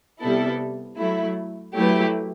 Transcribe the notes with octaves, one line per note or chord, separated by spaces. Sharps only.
C3 G3 B3 E4 A4
F#3 A3 E4
F#3 A3 E4 G4 B4